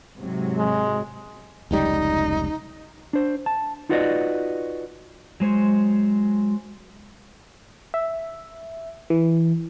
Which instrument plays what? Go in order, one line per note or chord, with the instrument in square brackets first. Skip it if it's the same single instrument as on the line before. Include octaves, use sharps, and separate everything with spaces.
[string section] G#2 C3 F#3
[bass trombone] G#3
[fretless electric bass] F1 C#2 G3 [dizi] D#4
[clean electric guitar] D4 C5
A5
D#4 F4 F#4 B4 D5 D#5
[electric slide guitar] F#3 G#3 C5 C#5
[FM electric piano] E5
E3